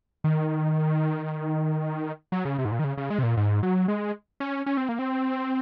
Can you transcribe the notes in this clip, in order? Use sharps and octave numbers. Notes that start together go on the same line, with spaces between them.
D#3
F#3
C#3
C3
G#2
A#2
D#3
C#3
C#3
G#3
C3
A#2
G#2
F#3
G#3
C#4
C#4
C4
A#3
C4